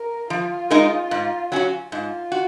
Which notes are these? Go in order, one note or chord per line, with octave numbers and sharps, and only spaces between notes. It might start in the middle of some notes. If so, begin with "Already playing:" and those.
Already playing: A#4
F3 F4
G#3 D#4 A#4
G#2
F#3 C#4 F#4
G#2 F4
F#4